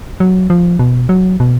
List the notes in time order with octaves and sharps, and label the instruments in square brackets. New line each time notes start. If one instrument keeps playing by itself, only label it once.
[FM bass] F#3
F3
B2
F#3
B2